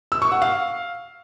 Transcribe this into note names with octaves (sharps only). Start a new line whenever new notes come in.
E6
C#6
F#5
F5